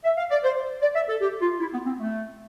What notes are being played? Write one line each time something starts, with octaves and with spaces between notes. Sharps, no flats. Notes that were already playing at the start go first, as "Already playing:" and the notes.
E5
F5
D5
C5
D5
E5
A4
G4
F4
E4
B3
C4
A3